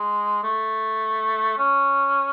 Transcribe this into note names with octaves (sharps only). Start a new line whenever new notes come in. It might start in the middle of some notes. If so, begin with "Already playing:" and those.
Already playing: G#3
A3
C#4